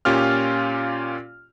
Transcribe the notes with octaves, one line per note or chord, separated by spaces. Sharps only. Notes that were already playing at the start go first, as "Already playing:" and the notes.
A#2 C#4 F4 G4 F6